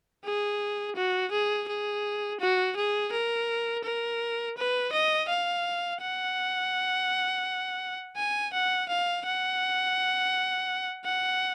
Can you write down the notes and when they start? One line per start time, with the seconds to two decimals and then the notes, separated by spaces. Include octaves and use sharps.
0.25 G#4
0.96 F#4
1.32 G#4
1.68 G#4
2.40 F#4
2.77 G#4
3.12 A#4
3.84 A#4
4.57 B4
4.92 D#5
5.29 F5
6.02 F#5
8.17 G#5
8.53 F#5
8.89 F5
9.26 F#5
11.05 F#5